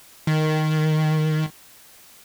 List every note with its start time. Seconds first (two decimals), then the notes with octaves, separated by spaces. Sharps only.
0.27 D#3